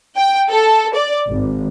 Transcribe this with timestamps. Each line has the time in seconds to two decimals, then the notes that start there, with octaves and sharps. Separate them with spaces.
0.16 G5
0.50 A4
0.95 D5
1.28 G#1